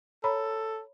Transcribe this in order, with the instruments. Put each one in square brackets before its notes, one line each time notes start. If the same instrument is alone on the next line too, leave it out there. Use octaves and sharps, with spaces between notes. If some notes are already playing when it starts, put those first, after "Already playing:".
[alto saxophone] A4 [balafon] C#5 A#5 B5